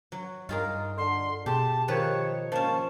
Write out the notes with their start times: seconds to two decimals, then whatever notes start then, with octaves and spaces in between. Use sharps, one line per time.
0.12 F#3
0.49 G2 D#4 F4 G#4 A#4
0.97 D3 C6
1.46 B2 G4 G#4 A5
1.88 D#3 F3 G4 B4 C#5
2.52 F3 A#3 C#4 A5